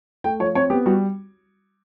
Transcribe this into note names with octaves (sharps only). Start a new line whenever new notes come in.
A3 G5
F3 C#5
C4 C#5
B3 G4
G3 F#4